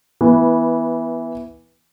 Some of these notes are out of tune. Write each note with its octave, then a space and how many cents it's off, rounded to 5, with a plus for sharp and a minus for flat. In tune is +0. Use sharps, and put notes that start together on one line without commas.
E3 +0 B3 -15